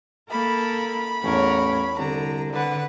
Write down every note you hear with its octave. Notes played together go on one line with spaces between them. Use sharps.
A#3 A4 A#4 B5
A1 E2 A#4 C#5
C2 D3 A#5
D3 B4 F#5